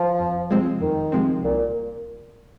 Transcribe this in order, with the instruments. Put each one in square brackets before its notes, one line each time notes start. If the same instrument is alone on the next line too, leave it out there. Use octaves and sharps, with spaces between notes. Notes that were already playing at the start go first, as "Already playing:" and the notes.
Already playing: [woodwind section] F3
[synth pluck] F2
C3 F3 G#3 C4
[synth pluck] F2 [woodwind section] D#3
[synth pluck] C3 F3 G#3 C4
[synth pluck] C2 [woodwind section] A#2